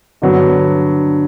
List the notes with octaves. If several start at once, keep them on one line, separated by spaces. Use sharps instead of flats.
G2 D3 F#3 B3